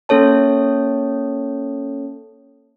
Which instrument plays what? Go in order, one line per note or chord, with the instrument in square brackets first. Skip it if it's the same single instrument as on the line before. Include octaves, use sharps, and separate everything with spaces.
[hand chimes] A#3 C#4 A4 C#5 A5